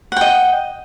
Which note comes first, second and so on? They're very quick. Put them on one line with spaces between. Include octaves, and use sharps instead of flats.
F#5 G5 D#5